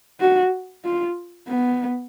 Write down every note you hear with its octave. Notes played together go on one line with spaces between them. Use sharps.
F#4
F4
B3